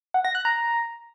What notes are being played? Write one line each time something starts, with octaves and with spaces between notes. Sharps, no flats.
F#5
A#6
F#6
A#5